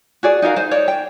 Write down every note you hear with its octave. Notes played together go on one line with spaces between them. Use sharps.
F#4 G#4 D5
D#4 F#4 A#4 F5
D#4 C5
C#5 D5
G5